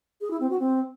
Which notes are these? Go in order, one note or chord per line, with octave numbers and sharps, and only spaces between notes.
G#4
E4
C4
F#4
C4